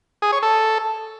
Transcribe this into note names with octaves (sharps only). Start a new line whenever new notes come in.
G#4
C#5
A4